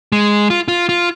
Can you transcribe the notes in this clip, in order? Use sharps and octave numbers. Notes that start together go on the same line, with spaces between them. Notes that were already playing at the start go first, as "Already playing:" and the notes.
G#3
F4
F4
F4